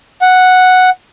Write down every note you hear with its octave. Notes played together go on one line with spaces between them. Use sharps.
F#5